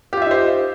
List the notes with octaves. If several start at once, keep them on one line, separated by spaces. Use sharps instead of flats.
D#4 F4 G4 C5 E5